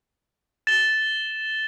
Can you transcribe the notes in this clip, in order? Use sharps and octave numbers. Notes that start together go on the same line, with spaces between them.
A6 E7 G7